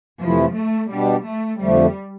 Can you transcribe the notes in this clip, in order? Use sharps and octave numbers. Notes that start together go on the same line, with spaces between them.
F2 C3 E3 F3 A3 E4
A3
B2 G3 B3 D4 G4
A3
F2 D3 F3 G3 A3